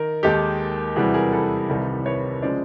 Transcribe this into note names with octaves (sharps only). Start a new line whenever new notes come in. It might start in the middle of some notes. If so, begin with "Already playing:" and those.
Already playing: D#3 A#4
D#2 D#3 G#3 G4 A4
E2 C3 E3 G3 F#4 G#4
G#4 A#4
A4 B4
C2 C3 D#3 G3
B4 C#5
C#3 F3 G#3 C5 D5